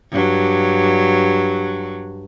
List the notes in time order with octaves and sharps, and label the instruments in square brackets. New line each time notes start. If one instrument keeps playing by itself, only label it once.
[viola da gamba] G2 F#3